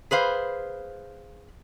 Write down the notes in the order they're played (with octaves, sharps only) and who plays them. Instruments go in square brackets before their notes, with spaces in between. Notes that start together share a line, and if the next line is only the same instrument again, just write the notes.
[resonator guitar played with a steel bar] G#4 B4 C5 F5